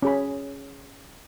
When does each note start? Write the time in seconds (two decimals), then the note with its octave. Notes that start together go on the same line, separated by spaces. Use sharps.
0.02 C#4 G#4 B5